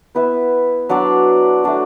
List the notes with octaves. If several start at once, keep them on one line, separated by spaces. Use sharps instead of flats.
B3 E4 B4 E5
F#3 D4 F#4 D5
A3 D4 F#4